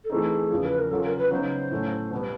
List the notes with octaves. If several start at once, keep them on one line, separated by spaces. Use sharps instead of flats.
A4
E3 A3 C4 D#4 G#4
E2 C#3 F3
B4
A#4
C#3 F#3 A#3 C#4 F4 A4
A#4
B4
C#3 F#3 B3 D#4 C5
A2 F#3 A3 C#4
B2 G3 B3